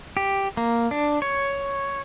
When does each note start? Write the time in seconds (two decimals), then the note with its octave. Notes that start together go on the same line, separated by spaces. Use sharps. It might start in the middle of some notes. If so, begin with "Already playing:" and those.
0.17 G4
0.57 A#3
0.91 D4
1.22 C#5